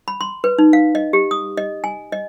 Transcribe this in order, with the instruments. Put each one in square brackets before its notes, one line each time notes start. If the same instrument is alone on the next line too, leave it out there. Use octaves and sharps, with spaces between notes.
[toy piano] B5
C6
B4
D#4
F5
D#5
G4
D#6
D#5
G#5
D#5